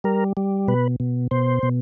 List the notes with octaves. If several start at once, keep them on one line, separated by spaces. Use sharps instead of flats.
G3 A#4
G3
B2 B4
B2
B2 C5
B2